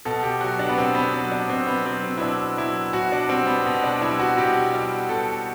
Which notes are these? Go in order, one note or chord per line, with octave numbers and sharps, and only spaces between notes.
B2 A4
G4
F#3 F#4
D4
B3
B2 C4
B3
F#3 C4
D4
B2 C4
B3
F#3 C4
C4
E4
B2 D4
F#3 E4
B2 F#4
D4
G3 C4
B3
B2
D4
G3 E4
F#4
B2 G4
G3
B2 A4